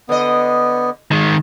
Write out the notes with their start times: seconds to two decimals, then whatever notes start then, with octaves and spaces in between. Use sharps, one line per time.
0.09 D3 B3 D#5
1.11 D#3 G#3